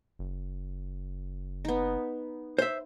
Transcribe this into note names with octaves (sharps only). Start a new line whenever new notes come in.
F#1
B3 D#4
C5 E5